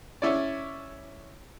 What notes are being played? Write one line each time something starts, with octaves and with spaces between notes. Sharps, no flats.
C#4 E4 C#5 D5